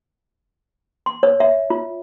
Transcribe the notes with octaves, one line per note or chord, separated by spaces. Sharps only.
C6
C#5
E5
F4